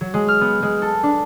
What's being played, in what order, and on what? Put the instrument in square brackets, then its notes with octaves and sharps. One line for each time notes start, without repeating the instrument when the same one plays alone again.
[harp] F#3
G#3
F6
B3
G#3
A4
D4